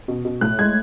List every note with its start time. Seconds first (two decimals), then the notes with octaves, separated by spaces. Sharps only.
0.08 B2
0.25 B2
0.41 A2 F#6
0.59 G#3 G#6